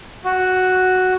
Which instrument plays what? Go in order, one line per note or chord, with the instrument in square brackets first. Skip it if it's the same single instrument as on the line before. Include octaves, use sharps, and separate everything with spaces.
[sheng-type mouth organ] F#4